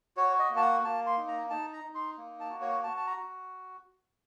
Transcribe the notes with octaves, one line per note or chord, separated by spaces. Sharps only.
F#4 C#5
D#5
A#3
A5
F#5
A#3 A5
C6
D#4
A#5
D#4 A5
A#5
D#4
C6
A#3
A5
F#4
C#5
F#4 A5
A5
A#5
F#4